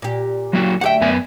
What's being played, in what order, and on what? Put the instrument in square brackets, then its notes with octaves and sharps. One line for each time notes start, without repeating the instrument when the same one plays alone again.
[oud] A#2 G4
[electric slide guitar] F#3 A#3 F#4
[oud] D2 G4 E5 [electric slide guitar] F#5 G5
[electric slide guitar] F#2 B3 G#5